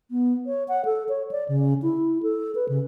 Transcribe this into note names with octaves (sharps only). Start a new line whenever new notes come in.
B3
C#5
F#5
A4
C#5
D5
C#3
E4
A4
B4
C#3